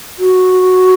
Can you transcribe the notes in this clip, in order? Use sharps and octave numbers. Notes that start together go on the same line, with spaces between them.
F#4